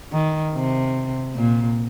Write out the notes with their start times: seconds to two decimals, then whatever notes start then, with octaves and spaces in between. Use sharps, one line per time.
0.13 D#3
0.55 C3
1.36 A#2